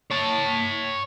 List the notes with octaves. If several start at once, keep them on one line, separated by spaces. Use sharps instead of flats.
C#5 A5